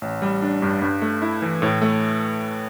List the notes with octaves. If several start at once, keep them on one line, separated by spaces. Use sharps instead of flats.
A1
G3
D4
G2
G2
A3
E4
E3
A2
A3